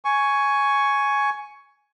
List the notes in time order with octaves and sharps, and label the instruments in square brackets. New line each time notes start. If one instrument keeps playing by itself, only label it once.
[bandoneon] G#5 C#6